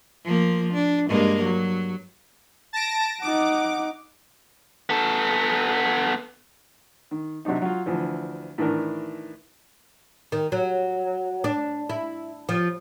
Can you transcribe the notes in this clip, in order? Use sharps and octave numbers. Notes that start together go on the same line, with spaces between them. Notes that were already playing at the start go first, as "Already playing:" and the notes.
F3 A#3
D4
G2 G#3 A#3
F#3
A5 A#6 D7
D#4 F#5 D6
B3 A4
D#3
C3 F#3 D4 D#4
F#3 F4
D2 E3 F3
A2 D#3 E3 D4 A#4
D#3
F#3
D4
E4
F3